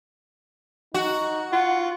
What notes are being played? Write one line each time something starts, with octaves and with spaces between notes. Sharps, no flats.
D#4 F#4
F4 F#5